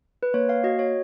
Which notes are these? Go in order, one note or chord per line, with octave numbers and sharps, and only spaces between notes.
B4
A#3 C#5
F5
F#4 D#5
C#5